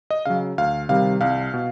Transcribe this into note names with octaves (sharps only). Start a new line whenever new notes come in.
D#5
C#3 F#3 F5
D2 F5
C3 D#3 G3 F5
C2 F5
B2